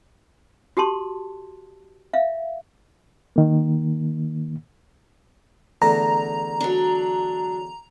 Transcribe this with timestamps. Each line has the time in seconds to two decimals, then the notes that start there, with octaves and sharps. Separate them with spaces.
0.77 F#4 G4 A4 A5 C6
2.13 E5 F5
3.36 D#3 A#3
5.82 E2 D3 A3 A#5
6.61 F#3 D4